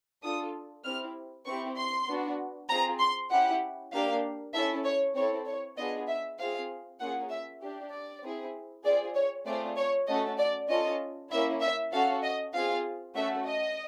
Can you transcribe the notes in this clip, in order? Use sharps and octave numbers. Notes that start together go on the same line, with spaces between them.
D4 F4 A4 D#6
C4 E4 G4 F6
C4 E4 G4 C#6
C6
B3 D4 F#4
C4 F4 G#4 A#5
C6
C#4 E4 G4 F#5
A#3 D4 G4 F5
C#4 E4 A4 E5
C#5
C4 E4 A4 C#5
C#5
B3 D4 F4 G#4 D#5
E5
C4 F4 G#4 F5
A#3 C#4 F4 G#4 F#5
E5
D4 G4
D5
C4 E4 G#4
C4 F4 G#4 D5
C#5
A3 C4 F4 G#4 D5
C#5
A3 C#4 F#4 A4 D#5
D5
C#4 F4 A4 D#5
A#3 C#4 E4 E5
E5
C#4 F#4 A4 F5
D#5
C4 F4 G#4 F5
A3 C#4 F#4 A4 E5
D#5